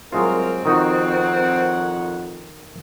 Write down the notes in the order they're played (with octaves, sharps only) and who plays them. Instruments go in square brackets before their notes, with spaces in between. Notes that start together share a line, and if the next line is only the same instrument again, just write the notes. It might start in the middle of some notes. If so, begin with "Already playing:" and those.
[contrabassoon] C2 [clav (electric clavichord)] F#3 G#3 F4 [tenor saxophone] C4 [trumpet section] A#4
[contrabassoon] F2 [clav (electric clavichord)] D#3 D#4 F#4 [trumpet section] A#4 C#5 F#5